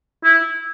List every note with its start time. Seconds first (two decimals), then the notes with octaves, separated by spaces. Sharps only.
0.24 E4